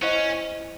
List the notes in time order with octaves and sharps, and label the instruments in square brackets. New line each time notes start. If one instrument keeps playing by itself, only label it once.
[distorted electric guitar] C#4 [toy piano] E4 C5 D#5 F#5